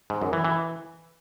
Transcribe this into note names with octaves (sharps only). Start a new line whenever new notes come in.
G#2
F#2
E3
E3